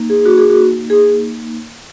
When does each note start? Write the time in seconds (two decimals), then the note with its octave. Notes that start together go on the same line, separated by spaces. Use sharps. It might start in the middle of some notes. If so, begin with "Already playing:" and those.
Already playing: A#3 D#4
0.10 G#4
0.25 F#4
0.38 G#4
0.50 F#4
0.90 G#4